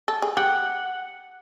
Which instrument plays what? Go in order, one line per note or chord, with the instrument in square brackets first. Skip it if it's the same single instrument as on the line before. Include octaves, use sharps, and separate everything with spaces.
[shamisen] A4
G#4
[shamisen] G4 [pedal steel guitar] F#5